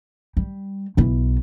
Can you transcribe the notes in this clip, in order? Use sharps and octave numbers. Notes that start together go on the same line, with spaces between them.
G3
B1 E4